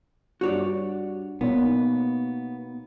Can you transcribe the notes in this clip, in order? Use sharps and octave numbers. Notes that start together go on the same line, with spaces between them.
G2 F#4 C#5 D5
B2 A#3 B3 D#4 C5 C#5